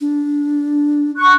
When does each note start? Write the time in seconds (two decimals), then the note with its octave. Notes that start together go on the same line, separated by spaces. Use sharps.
0.01 D4
1.17 C#6 F#6